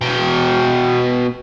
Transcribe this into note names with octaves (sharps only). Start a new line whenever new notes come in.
B2 G5